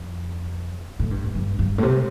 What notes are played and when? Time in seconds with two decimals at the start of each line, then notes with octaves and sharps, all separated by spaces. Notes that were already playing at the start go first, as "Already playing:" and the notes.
Already playing: F2
0.99 A2
1.11 G2
1.35 G2
1.59 G2
1.78 A2
1.83 C3